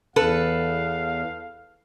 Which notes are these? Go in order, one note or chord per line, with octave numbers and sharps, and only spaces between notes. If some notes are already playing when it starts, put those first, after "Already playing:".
E2 A4 B4 F5